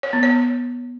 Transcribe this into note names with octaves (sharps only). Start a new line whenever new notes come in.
C#5
B3
C#5